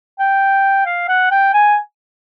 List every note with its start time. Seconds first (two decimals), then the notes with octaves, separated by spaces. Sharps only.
0.19 G5
0.86 F5
1.09 F#5
1.31 G5
1.54 G#5